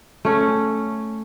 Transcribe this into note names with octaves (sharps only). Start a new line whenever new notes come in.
A3 C#4